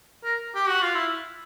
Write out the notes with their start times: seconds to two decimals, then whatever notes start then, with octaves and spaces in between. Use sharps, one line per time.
0.24 A#4
0.55 G4
0.68 F#4
0.82 F4
0.95 E4